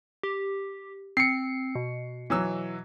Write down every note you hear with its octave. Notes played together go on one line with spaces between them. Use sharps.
G4
C4 C7 C#7
B2
E3 F#3 E6